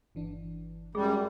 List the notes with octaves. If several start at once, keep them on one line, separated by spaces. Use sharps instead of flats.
G1 E3 D4
F#2 G3 G#3 G#4